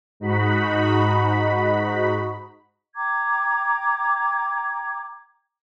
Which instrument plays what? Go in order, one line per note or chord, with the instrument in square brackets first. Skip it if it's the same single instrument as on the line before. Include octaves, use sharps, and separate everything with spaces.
[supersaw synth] G#2 D#4 F#4 B5
[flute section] G5 A#5 D6 G#6